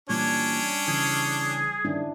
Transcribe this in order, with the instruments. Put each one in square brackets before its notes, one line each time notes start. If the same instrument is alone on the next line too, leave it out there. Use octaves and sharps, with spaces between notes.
[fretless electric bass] A#2 E3 [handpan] G3 [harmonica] C#4 D4 [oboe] C#5
[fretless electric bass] C#3 E3 [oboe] G#4
[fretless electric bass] G2 D#3 [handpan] C#4 D4 E4